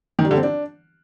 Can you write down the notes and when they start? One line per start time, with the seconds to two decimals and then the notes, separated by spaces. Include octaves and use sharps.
0.19 D#3
0.25 G3
0.31 D3
0.37 C4
0.43 D4